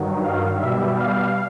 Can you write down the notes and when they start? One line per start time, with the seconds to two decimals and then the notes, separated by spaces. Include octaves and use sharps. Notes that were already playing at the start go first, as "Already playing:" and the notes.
Already playing: G2 D#3 F#3
0.22 F5
0.59 B2 G3 E5
0.95 F5